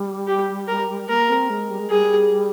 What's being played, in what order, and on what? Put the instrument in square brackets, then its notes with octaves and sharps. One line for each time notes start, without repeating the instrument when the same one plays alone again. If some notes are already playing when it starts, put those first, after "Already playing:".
Already playing: [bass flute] G3
[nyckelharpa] G4
A#4
[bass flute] A#3 [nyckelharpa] A#4
[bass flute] C4
G#3
G3
G#3
[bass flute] G3 [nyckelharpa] G#4